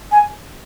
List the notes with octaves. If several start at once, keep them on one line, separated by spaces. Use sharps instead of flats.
G#5